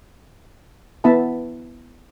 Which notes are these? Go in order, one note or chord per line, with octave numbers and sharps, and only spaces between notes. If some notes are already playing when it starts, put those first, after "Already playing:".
B3 E4 E5 A5 B5